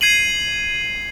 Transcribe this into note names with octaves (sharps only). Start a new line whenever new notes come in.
G#6 C7 D#7 F#7